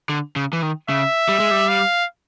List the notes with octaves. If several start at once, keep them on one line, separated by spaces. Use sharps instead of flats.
D3
C#3
E3
D#3
C#3 E5
G3
G#3
G3
F5